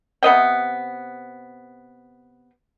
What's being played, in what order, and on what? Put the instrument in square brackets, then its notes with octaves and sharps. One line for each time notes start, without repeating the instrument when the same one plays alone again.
[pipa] C3 B3 D#5 G5